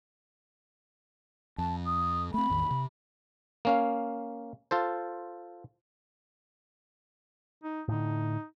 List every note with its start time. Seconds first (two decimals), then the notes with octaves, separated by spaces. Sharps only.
1.58 F2 A5
1.86 D#6
2.34 A3 C4 B5
2.50 A1 E2 D#3
2.71 C3
3.65 A#3 C#4 F5
4.71 F4 A4 C5
7.63 D#4
7.88 A2 D3 D#4